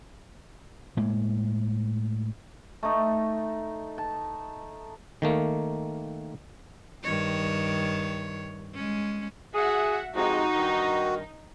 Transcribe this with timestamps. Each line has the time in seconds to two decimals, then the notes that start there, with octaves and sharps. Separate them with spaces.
0.97 A2 G#3 A#3
2.83 A3 D#4
3.98 A5
5.22 D#3 A3 A#3
7.03 G2 D#3 C#5
8.74 G#3 C#4
9.55 F#4 G#4 E5 F#5
10.15 C3 F3 G#3 D#4 F#4
10.55 G2 D#3